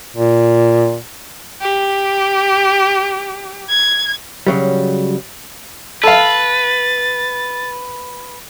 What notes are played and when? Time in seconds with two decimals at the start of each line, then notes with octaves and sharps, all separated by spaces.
0.16 A#2
1.61 G4
3.69 G#6
4.47 C#3 F#3 G3
6.03 A4 B4 F5 A6